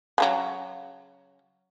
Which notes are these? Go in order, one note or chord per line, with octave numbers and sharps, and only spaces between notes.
C#3 F3 F#3